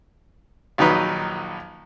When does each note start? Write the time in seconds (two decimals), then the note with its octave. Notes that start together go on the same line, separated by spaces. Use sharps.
0.78 A#1 D#3 F#3 D#4 B4